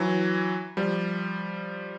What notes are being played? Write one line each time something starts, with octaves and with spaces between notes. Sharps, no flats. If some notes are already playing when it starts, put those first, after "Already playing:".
Already playing: E3 F#3
F3 G3